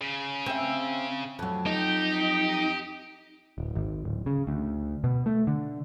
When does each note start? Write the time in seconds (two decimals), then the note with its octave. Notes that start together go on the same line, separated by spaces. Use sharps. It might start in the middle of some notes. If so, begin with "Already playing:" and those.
0.01 C#3
0.46 C4 E5
1.39 F2 F#3
1.66 D#4 G4
3.58 D1
3.75 G#1
4.05 D1
4.26 C#3
4.47 D2
5.04 B2
5.26 A3
5.47 D3